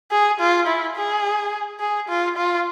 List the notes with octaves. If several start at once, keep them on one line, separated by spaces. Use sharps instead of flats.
G#4
F4
E4
G#4
G#4
F4
F4